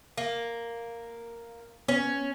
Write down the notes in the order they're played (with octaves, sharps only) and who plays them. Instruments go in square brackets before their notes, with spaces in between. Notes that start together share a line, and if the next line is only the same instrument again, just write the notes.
[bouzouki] A#3
[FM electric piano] B3 [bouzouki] C#4